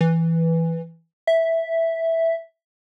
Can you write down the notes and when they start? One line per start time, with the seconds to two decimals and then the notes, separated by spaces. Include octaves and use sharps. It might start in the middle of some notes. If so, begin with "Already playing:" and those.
0.01 E3
1.27 E5